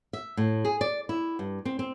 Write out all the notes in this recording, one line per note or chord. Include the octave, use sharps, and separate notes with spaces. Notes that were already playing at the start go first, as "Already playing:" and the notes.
E5
A2
G#4
D5
E4
G2
C4
C4